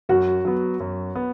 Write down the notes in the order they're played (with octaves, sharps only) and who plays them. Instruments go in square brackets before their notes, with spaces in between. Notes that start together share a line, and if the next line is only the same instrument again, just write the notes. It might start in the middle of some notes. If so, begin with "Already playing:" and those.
[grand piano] F#2 [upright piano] F#4
[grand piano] F#3 B3
F#2
B3